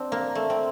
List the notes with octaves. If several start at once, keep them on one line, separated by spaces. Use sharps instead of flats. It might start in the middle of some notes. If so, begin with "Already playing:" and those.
Already playing: C4 D4
A#3
A3
C4